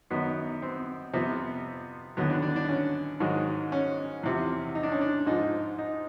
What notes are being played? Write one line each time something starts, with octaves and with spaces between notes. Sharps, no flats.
F#2 D#3 F#3 B3
C4
F2 C3 F3 B3
D#2 D3 F#3 B3
D4
D4
D4
C#4
G#2 D#3 F#3
C#4
E2 C3 F3
D#4
D4
C#4
D4
G#2 F3 D#4
D#4